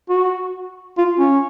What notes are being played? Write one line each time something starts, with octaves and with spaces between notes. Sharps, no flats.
F#4
F4
C#4